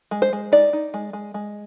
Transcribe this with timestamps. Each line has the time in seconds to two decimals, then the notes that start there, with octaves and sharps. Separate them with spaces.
0.11 G#3
0.22 C5
0.33 G#3
0.52 D#4 D5
0.73 D#4
0.94 G#3
1.13 G#3
1.34 G#3